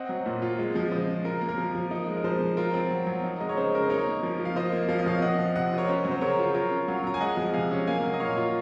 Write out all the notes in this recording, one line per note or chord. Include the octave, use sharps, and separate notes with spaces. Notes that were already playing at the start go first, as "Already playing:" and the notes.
Already playing: C4 D#5 F#5
F#3
A#2
F4
G#3
F3
C#3 C5 D#5
C#3
F4 A#4
A#3
A#4
F3
F3
D#4
G#3
A#4
F3 C5
F3
F4 A#4
C4
F#3
F#3
D#4
G#3 D#5
C#5
C#3 C5
C#3 A#4
C5
D#4 A#4 C#5
A#3
F3
F3
F5
F4 C5 D#5
A#3
F3 F5
D#5
F3 C#5 F5
C4 D#5 F#5
F3
C3 D#5 F#5
F4 D#5
A#4 C#5
C#4 C5
F#3
C5
C#3 A#4 C#5
F4
F4 A#4 C#5
C#4
F#3 C#5 F5
F#3 A#5
G#5
G#3 D#5 F#5
F3
C3 F5 G#5
C#4
A#3 F5 G#5
F#3
D#5
A#2 C#5 F5
F4